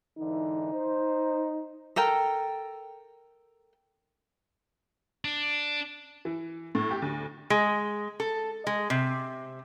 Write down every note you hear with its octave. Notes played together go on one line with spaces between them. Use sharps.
G#2 D3 E3 D#4
C5
A4 A#4 G5
D4
E3
A2
G4
D2
G#3
A4
G#3
C3